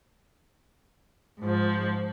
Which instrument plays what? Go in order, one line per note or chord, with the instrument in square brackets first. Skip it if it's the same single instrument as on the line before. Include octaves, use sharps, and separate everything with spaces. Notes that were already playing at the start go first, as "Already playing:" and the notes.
[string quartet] G#2 F3